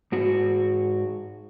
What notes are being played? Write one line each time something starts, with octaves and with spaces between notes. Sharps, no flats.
G#2 F#4